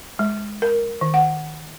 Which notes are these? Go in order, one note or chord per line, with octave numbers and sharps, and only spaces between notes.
G#3
A#4
D#3
F#5